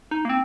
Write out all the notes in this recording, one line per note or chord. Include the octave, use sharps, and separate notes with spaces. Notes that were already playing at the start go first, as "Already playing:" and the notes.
D#4
A#3
C4